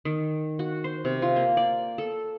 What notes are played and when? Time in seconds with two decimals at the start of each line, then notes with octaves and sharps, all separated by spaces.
0.05 D#3
0.59 F#4
0.84 C5
1.05 C3
1.22 F4
1.36 A#3
1.57 D5
1.98 A4